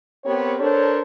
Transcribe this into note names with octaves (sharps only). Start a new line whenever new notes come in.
B3 C4 G4 A#4 C#5
D4 A4 A#4 C5 C#5